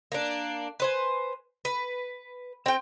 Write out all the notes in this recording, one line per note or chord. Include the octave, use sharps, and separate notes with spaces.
A#3 D4
B4 C5 G#5
B4
C4 G5